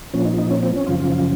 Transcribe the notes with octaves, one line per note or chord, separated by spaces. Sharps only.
A#2 F3 C#4
D#4
D#4
C#4
C4
C#4
F#2 C#3 F3 F4
F4
F4